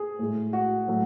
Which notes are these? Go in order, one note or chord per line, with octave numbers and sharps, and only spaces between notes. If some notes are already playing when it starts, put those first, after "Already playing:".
Already playing: G#4
A2 G#3
F#4
A2 F#3 A3